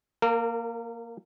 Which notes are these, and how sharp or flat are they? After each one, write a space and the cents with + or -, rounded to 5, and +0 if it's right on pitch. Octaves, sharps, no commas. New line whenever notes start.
A#3 +0 A#4 -35